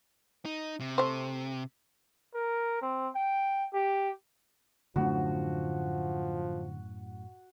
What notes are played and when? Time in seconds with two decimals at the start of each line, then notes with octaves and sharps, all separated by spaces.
0.45 D#4
0.80 C3
0.98 A3 C5
2.34 A#4
2.82 C4
3.15 G5
3.74 G4
4.96 F#2 A2 D3 F3 A3 D4 F#4